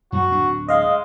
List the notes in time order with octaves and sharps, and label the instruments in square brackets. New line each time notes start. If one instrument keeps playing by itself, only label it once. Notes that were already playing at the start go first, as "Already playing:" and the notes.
[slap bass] F#2 [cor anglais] F#4
[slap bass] D1 D4
[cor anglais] G#3 [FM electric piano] D#5 F5